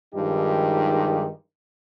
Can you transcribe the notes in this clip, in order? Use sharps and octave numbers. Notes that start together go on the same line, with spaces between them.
G2 D#3 F3 G#3 D#4 G4